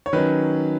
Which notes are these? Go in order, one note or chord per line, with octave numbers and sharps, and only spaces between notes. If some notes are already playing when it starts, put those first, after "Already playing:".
C#5
D#3 F#3 C#4 B4